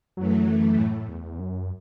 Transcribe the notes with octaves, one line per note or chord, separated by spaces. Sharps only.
F#2 E3 F#3 A3
A2
E2
F#2